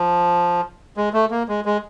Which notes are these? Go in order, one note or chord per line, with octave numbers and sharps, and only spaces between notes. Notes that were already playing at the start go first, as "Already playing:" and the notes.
Already playing: F3
G#3
A3
A#3
G#3
G#3